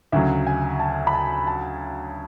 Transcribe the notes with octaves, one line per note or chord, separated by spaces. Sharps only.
D2 C#3 F#3 E5
G#5
A5
B5
A5
A5